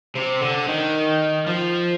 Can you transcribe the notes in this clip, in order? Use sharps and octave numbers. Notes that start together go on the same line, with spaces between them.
C3
D3
D#3
F3